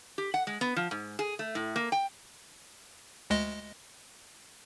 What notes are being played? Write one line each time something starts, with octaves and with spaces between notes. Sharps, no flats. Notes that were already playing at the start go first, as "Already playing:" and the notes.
G4
F#5
G#3
B3
F3
G#2
G#4
A3
A2
A#3
G5
D2 G#3 D#5